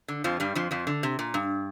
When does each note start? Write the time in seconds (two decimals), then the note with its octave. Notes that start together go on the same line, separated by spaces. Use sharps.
0.08 D3
0.24 F2 F3
0.40 G2 G3
0.55 F2 F3
0.71 F2 F3
0.87 D3
1.03 C3
1.19 A#2
1.34 G2